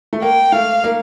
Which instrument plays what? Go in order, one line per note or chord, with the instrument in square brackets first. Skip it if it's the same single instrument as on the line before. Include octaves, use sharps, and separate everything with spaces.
[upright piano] A3
[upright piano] A#3 [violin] G5
[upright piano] A3 [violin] F5
[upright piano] A#3